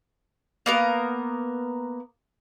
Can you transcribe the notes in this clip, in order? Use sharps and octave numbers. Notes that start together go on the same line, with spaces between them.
A#3 B3 A#4